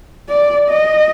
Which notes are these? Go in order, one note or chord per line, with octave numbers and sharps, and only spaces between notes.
D5
D#5